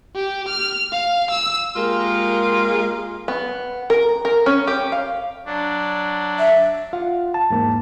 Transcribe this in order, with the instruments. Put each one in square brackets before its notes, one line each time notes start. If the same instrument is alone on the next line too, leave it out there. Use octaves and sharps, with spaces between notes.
[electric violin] G4
F6
F5
E6
[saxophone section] G#3 A#3 F4 G4 A#4
[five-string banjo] B3
A#4
A#4
C#4
G4
F5
[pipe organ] F#3 D4
[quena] E5
[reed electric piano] F4 F5 F#5
[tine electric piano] A5
[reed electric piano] E2 G#2 A#3